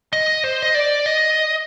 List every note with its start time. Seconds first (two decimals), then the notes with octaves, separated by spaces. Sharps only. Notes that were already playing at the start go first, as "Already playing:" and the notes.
0.13 D#5
0.44 C5
0.62 D#5
0.75 D5
1.06 D#5